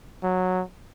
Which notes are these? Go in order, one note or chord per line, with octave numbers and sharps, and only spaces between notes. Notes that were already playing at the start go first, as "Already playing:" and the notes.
F#3